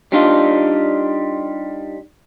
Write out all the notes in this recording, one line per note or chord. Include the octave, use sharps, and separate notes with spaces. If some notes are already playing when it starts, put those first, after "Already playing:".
G3 D4 D#4 F4